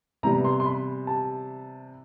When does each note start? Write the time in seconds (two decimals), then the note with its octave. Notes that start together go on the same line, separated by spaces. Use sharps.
0.23 C3 E3 G3 B3 A#5
0.45 C6
0.60 C6
0.66 B5
1.07 A5